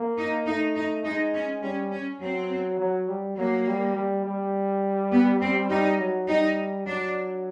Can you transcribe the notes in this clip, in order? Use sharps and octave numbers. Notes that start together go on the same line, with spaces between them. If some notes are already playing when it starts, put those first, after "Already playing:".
Already playing: A#3
D#4
A3 D#4
D#4
G#3 D#4
C#4
G3 C#4
C#4
F#3 C4
F#3
G3
F#3 A#3
G3
G3
G3
B3
C4
G3 D#4
F#3
G3 D#4
F#3 D4